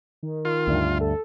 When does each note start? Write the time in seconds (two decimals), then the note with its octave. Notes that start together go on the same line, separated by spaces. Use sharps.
0.23 D#3
0.45 D#3 F4
0.68 D2 G2
1.01 A4